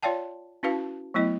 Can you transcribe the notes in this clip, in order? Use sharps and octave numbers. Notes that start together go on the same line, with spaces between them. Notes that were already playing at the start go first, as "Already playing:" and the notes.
F4 C#5 D5 F5 G5 A5
C#4 E4 F#4 B4 F5 A5
F#3 A3 B3 E4 D#5